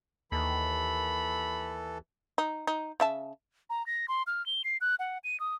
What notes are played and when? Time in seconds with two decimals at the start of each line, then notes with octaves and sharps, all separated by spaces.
0.32 D#2 E3 A4 B5
2.38 D#4
2.67 D#4
3.00 C#3 E5 A5
3.70 A#5
3.86 A#6
4.08 C6
4.27 F6
4.46 G7
4.64 C7
4.81 F#6
4.99 F#5
5.24 D#7
5.40 D#6